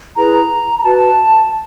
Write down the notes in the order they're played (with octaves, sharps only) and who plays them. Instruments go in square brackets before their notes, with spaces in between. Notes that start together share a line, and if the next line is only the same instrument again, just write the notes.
[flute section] E4 G#4 B4 A#5
A#5
F#4 B4 A5